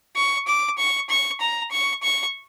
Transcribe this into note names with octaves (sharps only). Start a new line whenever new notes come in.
C#6
D6
C#6
C#6
A#5
C#6
C#6